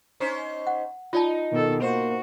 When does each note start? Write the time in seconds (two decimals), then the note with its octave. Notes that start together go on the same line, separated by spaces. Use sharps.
0.20 C#4 D#4 C5
0.67 F#5
1.13 D#4 F4 D5 A5
1.52 B2 D#3 A4
1.82 A#3 F#4 C5